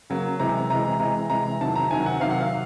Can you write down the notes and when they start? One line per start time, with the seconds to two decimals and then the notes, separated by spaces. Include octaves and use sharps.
0.10 C#3 F#3 A#3
0.40 C3 E3 G#3 A#5
0.70 C3 E3 G#3 A#5
0.84 A#5
1.00 C3 E3 G#3 A#5
1.30 C3 E3 G#3 A#5
1.61 C3 D#3 F#3 A5
1.76 A#5
1.91 C3 D#3 F#3 G#5
2.06 F#5
2.20 C3 D#3 F#3 F5
2.31 F#5
2.41 F5